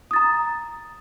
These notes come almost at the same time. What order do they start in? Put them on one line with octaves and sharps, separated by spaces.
D#6 A6 A#5